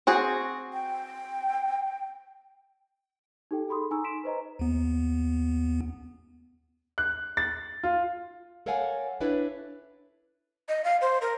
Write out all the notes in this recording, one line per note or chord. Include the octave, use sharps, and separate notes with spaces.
C4 F#4 G#4
G5
D#4 G4 A4 G5
G#4 A4 B5 C6 D#6
D#4 G#5 A#5 C#6 E6
C6 B6 D7 E7
B4 C5 D#5 A#5
D#2 B3
F#6
A6
F4
A4 A#4 C#5 F5 F#5 G#5
D4 E4 A4 B4 C#5
D#5
F5
C5
A#4